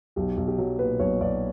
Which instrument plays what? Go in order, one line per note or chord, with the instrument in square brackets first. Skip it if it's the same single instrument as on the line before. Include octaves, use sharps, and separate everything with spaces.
[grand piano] B1 G4
B1
G4
F#3
A#2 B4
B1 C#5
B1 D5